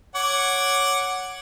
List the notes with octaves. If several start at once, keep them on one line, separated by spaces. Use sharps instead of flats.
C#5 F#5 D6